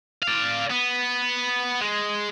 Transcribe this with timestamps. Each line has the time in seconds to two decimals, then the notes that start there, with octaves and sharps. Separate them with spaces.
0.23 D5 F5
0.70 B3
1.81 G#3